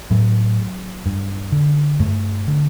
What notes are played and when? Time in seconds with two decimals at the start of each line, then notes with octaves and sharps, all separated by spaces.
0.11 A2 F#3
1.06 G2
1.52 D3
2.00 G2 A3
2.48 D3